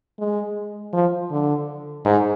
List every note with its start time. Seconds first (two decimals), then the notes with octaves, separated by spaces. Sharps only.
0.19 G#3
0.93 F3
1.31 D3
2.06 G#2